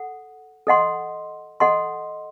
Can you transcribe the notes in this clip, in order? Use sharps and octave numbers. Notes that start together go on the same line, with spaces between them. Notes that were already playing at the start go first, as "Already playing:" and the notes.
Already playing: A4 F#5
A4 D#5 F#5 C6
A4 D#5 F#5 C6